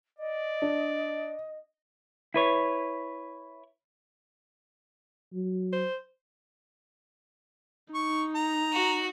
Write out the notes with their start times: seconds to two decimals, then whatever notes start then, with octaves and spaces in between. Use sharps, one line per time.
0.19 D5 D#5
0.62 D4
2.34 E4 B4 C#5
5.33 F#3
5.73 C5
7.95 D#4 C#6
8.35 A#5
8.73 F#4